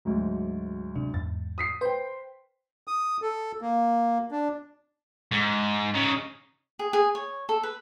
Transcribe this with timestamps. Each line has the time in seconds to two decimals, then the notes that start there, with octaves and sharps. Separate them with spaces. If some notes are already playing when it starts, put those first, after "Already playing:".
0.05 D2 G#2 F#3
0.96 C3 D4
1.14 E2 G#2 A6
1.58 D#6 B6 C7
1.81 B4 C5 G5 C6
2.88 D#6
3.22 A4
3.62 A#3
4.31 D4
5.32 G#2
5.94 C#3 D#4
6.79 G#4
6.93 G#4
7.15 C#5
7.49 A4
7.63 B4